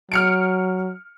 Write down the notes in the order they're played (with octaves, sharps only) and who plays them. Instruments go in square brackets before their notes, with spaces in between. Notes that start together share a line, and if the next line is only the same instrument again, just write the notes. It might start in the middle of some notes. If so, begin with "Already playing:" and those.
[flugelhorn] F#3 [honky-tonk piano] F6 C#7 D7